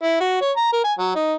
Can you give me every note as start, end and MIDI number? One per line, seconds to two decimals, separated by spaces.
0.03 0.16 64
0.21 0.38 66
0.41 0.51 73
0.57 0.69 82
0.73 0.83 70
0.84 0.93 80
0.99 1.13 54
1.16 1.34 63